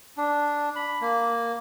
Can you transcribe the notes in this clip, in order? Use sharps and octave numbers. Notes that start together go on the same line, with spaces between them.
D4
B5
A#3